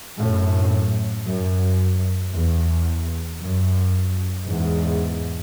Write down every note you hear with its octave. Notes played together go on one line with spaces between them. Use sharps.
F#2 A2
F#2
E2
F#2
E2 G#2